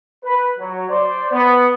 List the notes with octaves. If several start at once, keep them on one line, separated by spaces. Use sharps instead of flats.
B4
F#3
C5 D5
B3